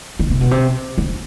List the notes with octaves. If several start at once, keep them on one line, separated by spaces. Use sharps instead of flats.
D#3
C3
B2
C3
D#3